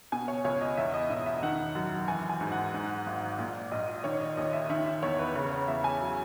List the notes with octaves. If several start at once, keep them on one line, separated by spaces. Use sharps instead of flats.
B2 G#5
C#5
C#2 C#5
D#5
E2 E5
D#5
E1 E5
E5
D#3 F#5
F#2
E3 G#5
G#5
G#2
F#5
G#2
G#1
A#2
A#1 D#5
D#3 C#5
D#5
D#2 D#5
E5
D#3 E5
E5
E2 C#5
B4
C#3 C#5
C#5
E2 E5
G#5
F#3